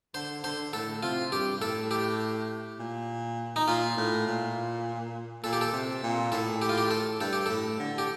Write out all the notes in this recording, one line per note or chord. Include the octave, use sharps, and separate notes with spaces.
D3 C5
D3 C5
A2 A4
C3 F4
G2 G4
A2 A4
G4
A#2
D#4
A#2 F4
A2
A#2
A#2 A4
G4
A4
C3
A#2
A2 A4
G4
F4
G4
A4
G2 A4
G4
A2 A4
D3
G4